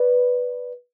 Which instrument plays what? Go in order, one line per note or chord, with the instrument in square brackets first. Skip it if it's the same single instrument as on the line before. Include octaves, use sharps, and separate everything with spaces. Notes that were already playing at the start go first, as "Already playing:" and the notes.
Already playing: [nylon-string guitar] B4 D5